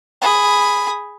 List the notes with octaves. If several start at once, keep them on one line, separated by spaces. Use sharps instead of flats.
G#4 B5